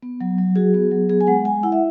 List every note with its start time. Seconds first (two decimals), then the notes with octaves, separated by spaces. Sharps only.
0.03 B3
0.21 F#3
0.38 F#3
0.56 F#4 G#4
0.74 B3
0.91 F#3
1.09 B3 G#4
1.21 G#5
1.27 G#3 F#5
1.45 G#3 G#5
1.63 E4 F#5
1.72 E5